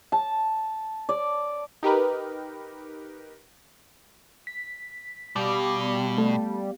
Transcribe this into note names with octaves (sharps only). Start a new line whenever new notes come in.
A5
D5
D#4 G4 A#4 B4
B6
B2 G3 B3 G4 F5 D6
A3